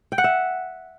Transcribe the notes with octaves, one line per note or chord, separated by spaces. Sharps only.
G5
F#5
E5